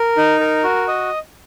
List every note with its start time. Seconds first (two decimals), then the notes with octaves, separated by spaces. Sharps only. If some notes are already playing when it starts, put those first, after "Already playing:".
Already playing: A#4
0.17 D#4
0.40 A#4
0.64 F#4
0.88 D#5